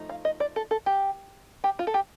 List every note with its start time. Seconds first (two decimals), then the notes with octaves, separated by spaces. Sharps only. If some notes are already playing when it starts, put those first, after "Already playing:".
Already playing: F3 A3 D#4
0.09 F5
0.25 D#5
0.40 D5
0.56 A4
0.71 A4
0.86 G4
1.64 G4
1.79 F4
1.87 A4
1.94 G4